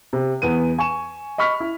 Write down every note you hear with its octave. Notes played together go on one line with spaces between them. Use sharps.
C3
E2 B3 D#7
G#5 C#6 E7
D#5 B5 C#6 F6 B6
E4